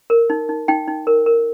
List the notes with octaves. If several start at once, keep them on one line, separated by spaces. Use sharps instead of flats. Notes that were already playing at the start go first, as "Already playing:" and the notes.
A#4
D#4
D#4
D#4 G5
D#4
A#4
A#4